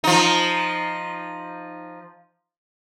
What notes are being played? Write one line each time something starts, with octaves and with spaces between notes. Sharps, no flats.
F3 D#4